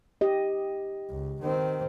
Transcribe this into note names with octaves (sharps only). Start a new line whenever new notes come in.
G4 D#5
C#2
D#3 C4